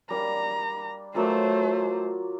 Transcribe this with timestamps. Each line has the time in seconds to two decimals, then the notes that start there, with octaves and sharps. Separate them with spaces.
0.10 G3 A#3 D4 A#5
1.15 F#3 A3 A#3 F4 C5